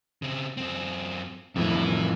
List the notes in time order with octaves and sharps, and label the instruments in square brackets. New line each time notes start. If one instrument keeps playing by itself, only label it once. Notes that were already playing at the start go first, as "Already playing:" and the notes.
[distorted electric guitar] C#3 C4
F#2 C4
[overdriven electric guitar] F2 A2 [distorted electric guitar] E3 E4